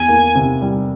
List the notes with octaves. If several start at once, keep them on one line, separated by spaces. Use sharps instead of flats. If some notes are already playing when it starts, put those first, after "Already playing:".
Already playing: E2 G#5
A#3
C3
G3